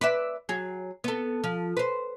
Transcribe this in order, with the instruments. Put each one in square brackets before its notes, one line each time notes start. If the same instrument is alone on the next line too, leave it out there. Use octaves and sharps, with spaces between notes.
[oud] B4 D5 E5
F#3 G#4
B3 A4
F3
B4 C5